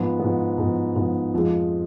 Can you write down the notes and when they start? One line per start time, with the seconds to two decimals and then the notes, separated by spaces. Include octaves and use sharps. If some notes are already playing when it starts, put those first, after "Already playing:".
Already playing: G#2 F3 B3
0.20 G#2 F3 B3
0.58 G#2 F3 B3
0.96 G#2 F3 B3
1.34 F2 F3 G#3